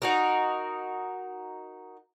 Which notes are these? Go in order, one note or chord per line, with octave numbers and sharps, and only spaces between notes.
D#4 F#4 A#4